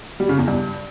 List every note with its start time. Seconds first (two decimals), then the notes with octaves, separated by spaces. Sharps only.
0.20 G3
0.29 C#3
0.38 E2
0.48 G2